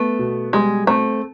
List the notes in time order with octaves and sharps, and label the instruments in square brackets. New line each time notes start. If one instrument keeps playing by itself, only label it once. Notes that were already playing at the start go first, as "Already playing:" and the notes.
Already playing: [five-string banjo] A3 [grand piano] B3
[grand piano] B2
[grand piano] G3 [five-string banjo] G#3
[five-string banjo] A3 [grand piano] C4